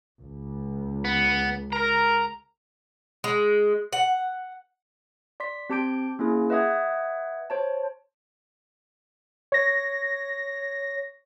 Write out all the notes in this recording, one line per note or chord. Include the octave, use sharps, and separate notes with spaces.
C#2
B3
A#4 A#5
G#3
F#5
D5 C6 B6
C4 G4 A5 D6 G6 D7
A#3 C#4 E4 G#4
B4 D#5 E5 F#5 D#6 G#6
C5 C#5 A5
C#5 A#6